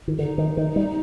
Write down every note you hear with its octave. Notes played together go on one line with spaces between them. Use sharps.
D#3
D3 D#4
D#3
D#3
G3